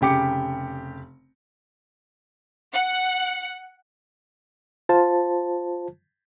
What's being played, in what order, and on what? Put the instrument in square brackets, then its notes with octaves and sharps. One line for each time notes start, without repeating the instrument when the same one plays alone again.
[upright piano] F1 C#3 G4 D6 C#7
[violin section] F#5
[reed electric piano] F4 C5 A5